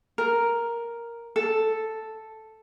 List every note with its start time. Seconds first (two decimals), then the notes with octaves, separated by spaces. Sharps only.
0.18 A#4
1.36 A4